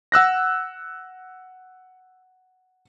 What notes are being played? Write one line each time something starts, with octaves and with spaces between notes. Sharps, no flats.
F#5 E6 F#6 A#6